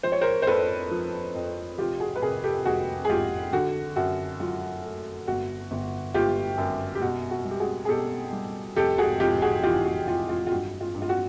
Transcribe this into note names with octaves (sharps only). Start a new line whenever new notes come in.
F3 C5
C#5
A#4 C5
C5
F2 A4 B4
F3
F2
F1 F4 G4
F#4 G#4
B4
C3 G#4 A#4
G4 A4
F1 F#4 G#4
G#4
F1 F4 G4
D3 F#4
F#2 F#4
F#3 F4
A3
G1 F#4
G1
G1 F4 G4
F#2
G4
B2 F#4
F#4
G3
G4
F#4 G#4
G#4
B2 G4 A4
G3
F1 G4 A4
F#4 G#4
F1 F4 G4
F#4 G#4
E3 F4 G4
F#4
E3 F4
F4
F4
G2 F#4
F4
G2
F4
F#4